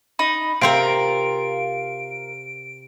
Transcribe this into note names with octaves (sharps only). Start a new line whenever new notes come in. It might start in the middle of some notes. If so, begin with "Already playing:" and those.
D#4 B5
C3 C4 F4 A#4 D7